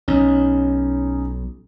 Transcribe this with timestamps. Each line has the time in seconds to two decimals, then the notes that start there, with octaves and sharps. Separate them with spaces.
0.08 B1 C#4 D#4